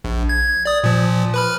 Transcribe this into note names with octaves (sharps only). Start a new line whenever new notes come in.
A#1
G#6
D5 D#6
A#2 F3
B4 B5 F6